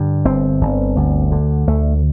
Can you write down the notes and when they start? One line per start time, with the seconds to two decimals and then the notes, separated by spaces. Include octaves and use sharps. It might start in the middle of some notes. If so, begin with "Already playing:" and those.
Already playing: G2 D3
0.25 G1 C4
0.61 G1
0.96 D2
1.32 D3
1.67 D2 A3